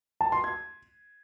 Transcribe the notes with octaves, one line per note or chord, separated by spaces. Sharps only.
A5
C6
G#6